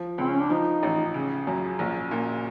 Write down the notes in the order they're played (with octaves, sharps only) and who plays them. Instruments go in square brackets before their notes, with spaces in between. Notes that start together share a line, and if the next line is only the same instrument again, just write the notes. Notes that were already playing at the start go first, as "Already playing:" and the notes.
Already playing: [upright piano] F3
[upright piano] C#2 [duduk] C4
[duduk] C#4
D4
[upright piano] F3 [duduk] D#4
[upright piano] A1
C#3
F#2
A#1
A#2